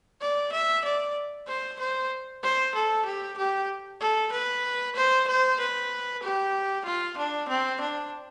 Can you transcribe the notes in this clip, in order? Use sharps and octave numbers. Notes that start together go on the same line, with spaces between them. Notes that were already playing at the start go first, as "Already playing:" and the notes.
D5
E5
D5
C5
C5
C5
A4
G4
G4
A4
B4
C5
C5
B4
G4
F4
D4
C4
D4